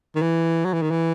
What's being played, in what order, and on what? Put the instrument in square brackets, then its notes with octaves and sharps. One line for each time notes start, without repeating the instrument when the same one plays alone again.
[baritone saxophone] D#3
E3
F#3
E3
D#3
E3